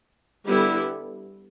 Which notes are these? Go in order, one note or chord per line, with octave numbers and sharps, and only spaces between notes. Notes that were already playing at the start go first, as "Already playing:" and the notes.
D3 G3 B3 E4 G4